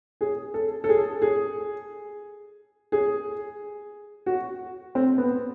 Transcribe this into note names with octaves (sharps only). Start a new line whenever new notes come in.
G#4
A4
A4
G#4
G#4
G#4
F#4
C4
B3